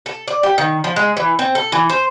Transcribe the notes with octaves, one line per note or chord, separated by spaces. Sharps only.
A4
D5
G4
D#3
F3
G#3
E3
C4
A4
E3
C5